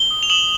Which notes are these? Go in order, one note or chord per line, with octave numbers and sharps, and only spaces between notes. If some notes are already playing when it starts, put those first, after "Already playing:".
Already playing: G7
D#6
F7
D#6 E7 F#7